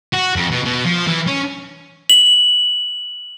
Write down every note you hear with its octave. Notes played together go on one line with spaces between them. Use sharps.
F#4
F2
B2
B2
F3
E3
C#4
F#7